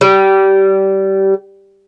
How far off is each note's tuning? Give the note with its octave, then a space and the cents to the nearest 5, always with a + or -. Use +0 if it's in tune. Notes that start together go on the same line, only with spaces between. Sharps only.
G3 -20